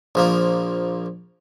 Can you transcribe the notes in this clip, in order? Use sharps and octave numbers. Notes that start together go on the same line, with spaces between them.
A#1 F3 A#3